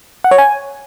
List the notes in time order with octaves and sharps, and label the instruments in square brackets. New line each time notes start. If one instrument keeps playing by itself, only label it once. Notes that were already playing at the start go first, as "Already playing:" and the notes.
[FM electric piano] F#5
C#5
G#5